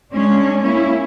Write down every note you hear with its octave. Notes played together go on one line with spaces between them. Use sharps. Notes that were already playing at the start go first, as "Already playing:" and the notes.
G#3 C#4 D4
A#3 C#4 E4